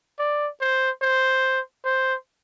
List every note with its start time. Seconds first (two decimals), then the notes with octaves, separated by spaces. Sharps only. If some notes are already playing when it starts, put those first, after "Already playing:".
0.19 D5
0.61 C5
1.02 C5
1.85 C5